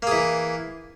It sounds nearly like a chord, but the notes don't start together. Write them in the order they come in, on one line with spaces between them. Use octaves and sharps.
A#3 G#4 E3